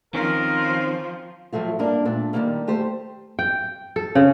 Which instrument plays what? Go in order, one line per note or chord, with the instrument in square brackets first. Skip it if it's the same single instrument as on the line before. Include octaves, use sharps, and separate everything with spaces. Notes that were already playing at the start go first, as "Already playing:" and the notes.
[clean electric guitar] D#3 C4 C#4 [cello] F3 [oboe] A#4
[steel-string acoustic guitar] A2 F3 F#3 A3 F4
G2 A#3 D4 A#4
A#2 A3 D4
D3 D#3 F#3 G3 A#3 C#4
A3 G4 C5
[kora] G5
A4
C#3